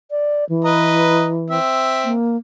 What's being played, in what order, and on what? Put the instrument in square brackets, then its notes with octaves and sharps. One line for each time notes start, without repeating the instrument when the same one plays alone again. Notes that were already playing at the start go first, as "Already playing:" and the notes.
[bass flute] D5
E3
[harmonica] B4 D#5 A#5
C4 E5
[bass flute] A#3